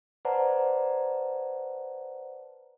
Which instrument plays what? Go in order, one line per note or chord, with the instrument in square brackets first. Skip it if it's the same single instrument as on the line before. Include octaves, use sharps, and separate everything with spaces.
[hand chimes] B4 C5 D5 F#5 A5 A#5